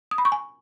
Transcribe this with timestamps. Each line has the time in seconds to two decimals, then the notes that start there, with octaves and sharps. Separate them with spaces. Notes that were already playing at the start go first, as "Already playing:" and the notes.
0.11 D#6
0.18 B5
0.25 C#6
0.32 G#5